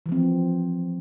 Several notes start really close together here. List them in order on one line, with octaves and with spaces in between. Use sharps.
E3 F3 C4